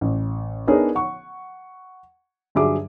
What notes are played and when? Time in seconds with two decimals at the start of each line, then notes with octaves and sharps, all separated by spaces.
0.01 A1
0.67 B3 D4 D#4 G#4 A#4 C#5
0.95 F#5 C#6
2.55 G2 D3 F#3 G#4 E5 D6